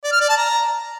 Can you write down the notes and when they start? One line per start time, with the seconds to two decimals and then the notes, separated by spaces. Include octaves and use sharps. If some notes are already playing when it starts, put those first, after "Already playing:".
0.04 D5
0.12 F6
0.20 D5
0.29 A5
0.37 A#5